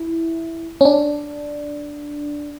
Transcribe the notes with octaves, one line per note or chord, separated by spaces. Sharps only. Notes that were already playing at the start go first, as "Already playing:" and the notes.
Already playing: E4
C#4
D4